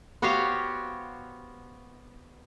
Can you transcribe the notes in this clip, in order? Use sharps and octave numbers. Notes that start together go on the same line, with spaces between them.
B3 F#4 G4 C5 C#5 F5